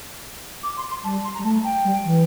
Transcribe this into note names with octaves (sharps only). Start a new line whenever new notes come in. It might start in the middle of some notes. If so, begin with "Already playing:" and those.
D6
C6
C6
G3 A5
C6
A#5
G3
A3 A5
G5
G3
E3